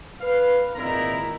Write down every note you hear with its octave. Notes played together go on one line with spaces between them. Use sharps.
B4 F5
G#1 A#2 D#3 E4 A#4 A#5